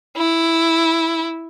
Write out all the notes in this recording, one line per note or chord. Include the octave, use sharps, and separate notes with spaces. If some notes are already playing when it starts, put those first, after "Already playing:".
E4